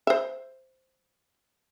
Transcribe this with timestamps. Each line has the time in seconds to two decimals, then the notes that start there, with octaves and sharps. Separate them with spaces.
0.07 C5 E5